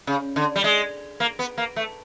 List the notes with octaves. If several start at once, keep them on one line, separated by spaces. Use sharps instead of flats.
C#3
D3
G3
G#3
A#3
B3
A#3
A3